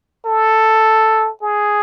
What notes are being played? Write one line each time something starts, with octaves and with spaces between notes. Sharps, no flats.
A4
G#4